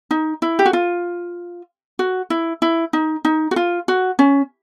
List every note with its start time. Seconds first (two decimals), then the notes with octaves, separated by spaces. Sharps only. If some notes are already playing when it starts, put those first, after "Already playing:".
0.11 D#4
0.42 E4
0.59 G4
0.66 F#4
0.73 F4
1.99 F#4
2.30 E4
2.62 E4
2.93 D#4
3.25 D#4
3.51 F#4
3.56 F4
3.88 F#4
4.19 C#4